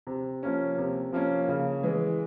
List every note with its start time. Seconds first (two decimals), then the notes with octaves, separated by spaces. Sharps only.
0.07 C3
0.43 F3 A#3 C#4
0.78 C3
1.13 F3 A#3 C#4
1.49 C#3
1.83 E3 G#3